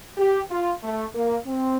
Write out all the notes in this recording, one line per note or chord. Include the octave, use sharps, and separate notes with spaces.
G4
F4
A3
A#3
C4